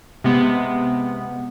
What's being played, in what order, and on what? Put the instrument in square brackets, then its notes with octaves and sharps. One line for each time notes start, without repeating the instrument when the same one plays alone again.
[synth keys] C3 G#3 B3